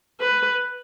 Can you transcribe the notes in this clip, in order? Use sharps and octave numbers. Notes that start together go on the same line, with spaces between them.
B4